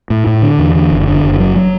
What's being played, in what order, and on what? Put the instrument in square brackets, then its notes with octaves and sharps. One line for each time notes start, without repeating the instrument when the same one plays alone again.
[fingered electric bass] A2
A2
D3
E2
D3
F#1
D3
F#1
F#3
F#3